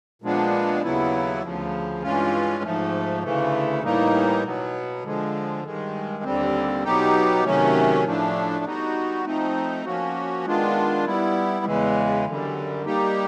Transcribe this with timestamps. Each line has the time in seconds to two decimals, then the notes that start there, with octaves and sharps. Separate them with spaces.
0.22 A#2 F3 G#3 B3 D4
0.83 D#2 C#3 F#3 B3 E4
1.43 D2 C#3 F3
2.02 G2 E3 G#3 C#4 F4
2.63 G#2 F3 A3
3.23 D2 C#3 E3 A3
3.83 A2 E3 G3 A#3 D#4
4.43 B2 F#3 B3
5.03 D3 F3 G#3
5.64 G2 D#3 G#3
6.23 D#2 D3 G3 C4
6.84 B2 F#3 B3 D#4 G4
7.44 C3 D#3 F#3 A3 C#4
8.04 A2 F3 A3 D4
8.64 G3 B3 D#4 F#4
9.24 F3 A3 C4 D#4
9.85 F3 A#3 C#4 F#4
10.46 D#3 G#3 B3 D4 F4
11.05 G3 B3 E4
11.65 E2 C#3 E3 G#3
12.25 F#2 D3 G3
12.85 G3 A#3 D#4 G4